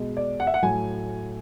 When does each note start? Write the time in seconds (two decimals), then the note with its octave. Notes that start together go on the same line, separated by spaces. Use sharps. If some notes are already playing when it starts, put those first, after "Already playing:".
Already playing: B2 G#3
0.17 D5
0.40 F#5
0.47 E5
0.54 F#5
0.63 A2 F#3 A3 G#5